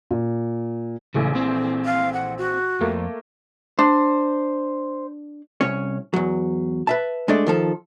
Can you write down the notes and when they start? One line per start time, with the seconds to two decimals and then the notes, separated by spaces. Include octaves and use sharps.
0.11 A#2
1.15 A#1 C#3 E3 A3
1.35 C4
1.85 F5
2.13 F#5
2.38 F#4
2.81 F2 A3 A#3
3.79 D4 C5
5.61 C2 C#4 C#5
6.14 E2 F#3
6.87 B4 E5 A5
7.28 G#3 A3 D4 A4 D5 D#5
7.47 D#3 F3 A4